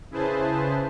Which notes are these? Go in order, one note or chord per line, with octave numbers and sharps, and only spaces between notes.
C#3 E4 G#4 B4 C5 A5